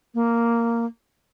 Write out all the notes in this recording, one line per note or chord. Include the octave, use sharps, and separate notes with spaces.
A#3